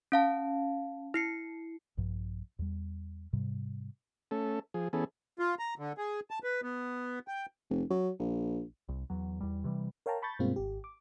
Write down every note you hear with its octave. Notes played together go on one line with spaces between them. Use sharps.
C#4 F5 A5
E4 C7 C#7
A#1 G2 F3
E2 G3
G#2 C3 G3
A3 C#4 A4
F3 G#4
E3 B3 C#4 G#4 A4
F4
A#5
D3
G#4
A5
B4
B3
G5
F1
F#3
A#1
C2
E2 F#3
E2 G3
C3 E3 G3
A#4 C#5 F5 G5 A5 A#5
A5 B5 C#6 G6 A6
G2 B2 G#3 A#3 C4 F4
G#1 G4
D6